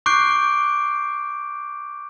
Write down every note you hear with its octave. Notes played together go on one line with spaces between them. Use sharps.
C#6 D6 F#6 G6 C7 D7